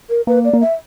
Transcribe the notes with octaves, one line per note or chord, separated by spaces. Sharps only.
A#4
A#3 B4
D5
A#3
E5